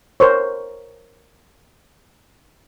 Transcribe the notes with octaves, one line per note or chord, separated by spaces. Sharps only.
A#4 C5 C#5